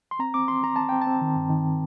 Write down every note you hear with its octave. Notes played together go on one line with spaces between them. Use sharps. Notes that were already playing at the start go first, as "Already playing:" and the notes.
C6
C4 A#5
C4 D6
C4 C6
C4 A#5
C4 A5
C4 G5
A5
C4
D#3
G2
D#3